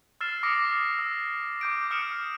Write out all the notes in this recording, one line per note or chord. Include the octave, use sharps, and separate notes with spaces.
E6 F6 A6 C7 E7
D6 D#6 A#6 C#7 D7
E6
D6 G6 D7
D#6 F6 C#7 D7 E7 F#7